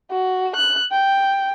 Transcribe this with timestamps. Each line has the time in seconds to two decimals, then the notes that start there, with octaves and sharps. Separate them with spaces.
0.11 F#4
0.56 F#6
0.92 G5